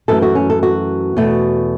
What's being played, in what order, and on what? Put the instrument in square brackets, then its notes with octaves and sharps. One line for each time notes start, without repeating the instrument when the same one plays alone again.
[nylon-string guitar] F#2 E3 A3 A4
F#4
C#4
A4
F#4
E2 B2 A3